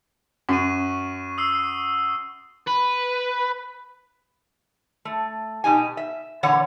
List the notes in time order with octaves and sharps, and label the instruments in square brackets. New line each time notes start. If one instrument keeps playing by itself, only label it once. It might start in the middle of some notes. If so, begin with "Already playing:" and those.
[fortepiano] F#2 [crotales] C#6 D#7
[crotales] D#6 E6 C7
[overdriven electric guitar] B4
[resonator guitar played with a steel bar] A3
B2 D#4 G4 G#5
E5
A#2 D3 E3 C#5 F#5